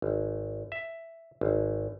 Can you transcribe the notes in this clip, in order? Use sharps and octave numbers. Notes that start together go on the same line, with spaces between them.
G#1
E5
G#1